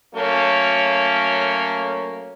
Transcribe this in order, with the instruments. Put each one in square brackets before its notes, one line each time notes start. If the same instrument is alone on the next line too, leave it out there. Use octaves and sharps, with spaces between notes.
[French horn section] F#3 A3 A#3 C#4